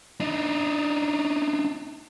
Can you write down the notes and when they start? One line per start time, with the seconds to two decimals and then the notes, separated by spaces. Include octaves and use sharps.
0.20 D4 D#4